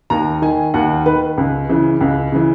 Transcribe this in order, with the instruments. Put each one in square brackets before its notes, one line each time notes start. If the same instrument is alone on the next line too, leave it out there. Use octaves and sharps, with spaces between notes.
[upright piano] D#2 A#5
D#3 G#5
D#2 F#5
D#3 B4
C#2
C#3 E3
C#2
C#3 E3